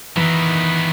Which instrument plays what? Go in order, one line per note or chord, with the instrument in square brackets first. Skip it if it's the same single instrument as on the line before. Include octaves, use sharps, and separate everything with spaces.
[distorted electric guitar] D#3 B3 [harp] E3